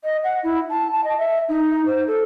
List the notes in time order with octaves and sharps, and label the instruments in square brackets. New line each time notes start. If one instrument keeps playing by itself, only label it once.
[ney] D#5
F#5
E4
A5
A5
D#5
E5
D#4
C5
A4